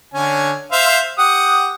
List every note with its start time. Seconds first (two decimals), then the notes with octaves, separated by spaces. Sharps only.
0.14 D3 C#4 G#5
0.72 C5 E5 F5
1.18 G4 F#5 D#6